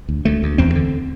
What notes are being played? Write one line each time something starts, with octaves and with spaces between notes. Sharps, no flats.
D2
D2 A3
D2
E2 C4
D3